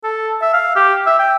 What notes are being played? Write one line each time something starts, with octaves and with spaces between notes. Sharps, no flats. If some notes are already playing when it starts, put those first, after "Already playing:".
A4
E5
F5
G4
E5
G5